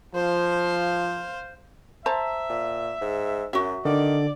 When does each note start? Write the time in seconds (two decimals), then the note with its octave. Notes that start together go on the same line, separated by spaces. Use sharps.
0.15 F3 C5 F5
2.06 C5 E5 A5 A#5
2.50 A#2
3.01 G#2
3.53 F#2 F#4 E5
3.85 D3 D#3 D5